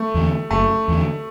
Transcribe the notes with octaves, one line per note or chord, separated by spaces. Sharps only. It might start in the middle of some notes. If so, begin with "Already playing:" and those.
Already playing: A3
E2 D3
F#1 A3
E2 D3